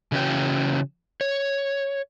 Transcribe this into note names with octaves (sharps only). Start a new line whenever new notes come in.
C#3 E3 C#4 F#4 C#5 G5
C#5